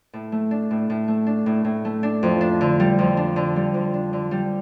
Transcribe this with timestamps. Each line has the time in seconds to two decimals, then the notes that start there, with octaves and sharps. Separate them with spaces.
0.13 A2
0.32 A3
0.51 D4
0.71 A2
0.90 A2
1.08 A3
1.26 D4
1.46 A2
1.65 A2
1.85 A3
2.03 D4
2.23 F2
2.41 D4
2.61 D3
2.80 G3
2.99 F2
3.17 D4
3.36 D3
3.56 G3
3.74 F2
3.94 D4
4.13 D3
4.31 G3